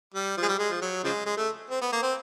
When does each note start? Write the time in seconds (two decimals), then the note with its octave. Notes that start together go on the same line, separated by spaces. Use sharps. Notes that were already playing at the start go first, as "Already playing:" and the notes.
0.14 G3
0.37 F3
0.43 G#3
0.48 G3
0.59 G#3
0.70 F3
0.81 F#3
1.04 C#3 F3 G#3
1.26 G#3
1.37 A3
1.70 C4
1.82 B3
1.93 A#3
2.03 C4